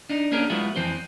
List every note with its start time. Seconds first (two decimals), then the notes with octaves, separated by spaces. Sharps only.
0.09 D4 D#4
0.32 A#3 C#4 D4 G#4 A#4
0.50 F#3 G#3 B3 E4 F4
0.76 F2 E3 C4 C5